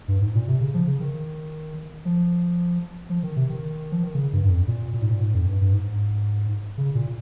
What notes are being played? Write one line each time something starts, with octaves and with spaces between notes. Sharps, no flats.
G2
G#2
A#2
C3
C#3
F3
C#3
D#3
F3
F3
D#3
C3
D#3
F3
D#3
C#3
G2
G2
F2
A#2
A#2
G#2
A#2
G#2
F2
G2
G2
G#2
C#3
A#2